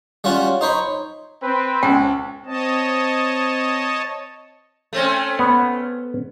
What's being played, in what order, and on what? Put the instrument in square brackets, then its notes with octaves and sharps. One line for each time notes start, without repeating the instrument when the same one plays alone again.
[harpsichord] G3 C#4 F4 F#4
D#4 C5 C#5 B5
[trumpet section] C4 B4
[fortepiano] C#2 [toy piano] G5
[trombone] C4 [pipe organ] C#5 D#5 A5
[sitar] A3 C4 C#4
[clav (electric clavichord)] B3